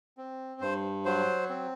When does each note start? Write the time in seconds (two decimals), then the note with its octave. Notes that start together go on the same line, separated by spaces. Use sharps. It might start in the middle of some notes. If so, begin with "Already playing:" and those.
0.17 C4
0.61 G2 C5
1.05 F#3 C5
1.49 C4